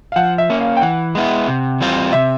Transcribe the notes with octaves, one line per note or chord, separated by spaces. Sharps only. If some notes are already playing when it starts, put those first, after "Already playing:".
F5
F3 F#5
E5
A#3 C#4
F5
G5
E3 F#5
G#3 B3 E4
C3
E3 G3 C4 F4
C3 E5